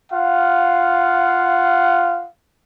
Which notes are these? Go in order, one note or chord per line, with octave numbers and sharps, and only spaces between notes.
F4 F5 F#5